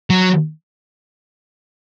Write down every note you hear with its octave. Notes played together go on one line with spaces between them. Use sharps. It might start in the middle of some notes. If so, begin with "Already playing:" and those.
F#3